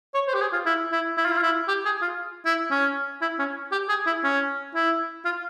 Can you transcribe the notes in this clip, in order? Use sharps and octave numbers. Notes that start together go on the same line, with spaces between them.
C#5
C5
G4
G#4
F4
E4
E4
E4
F4
E4
F4
E4
G4
G#4
F4
E4
C#4
E4
C#4
G4
G#4
E4
C#4
E4
F4